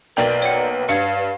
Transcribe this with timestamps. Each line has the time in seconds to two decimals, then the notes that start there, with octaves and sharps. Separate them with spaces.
0.17 B1 A#3 B4 D5 G5
0.42 C#5 F#5
0.89 G2 F5 G#6 C#7